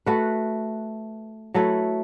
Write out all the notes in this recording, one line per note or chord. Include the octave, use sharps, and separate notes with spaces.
A3 F#4 B4
F#3 A3 E4 B4